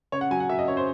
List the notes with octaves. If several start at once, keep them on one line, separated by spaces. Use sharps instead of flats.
C#3 C#5
F#5
F#3 G#5
F#5
F#3 E5
D#5
C#3 C#5
C5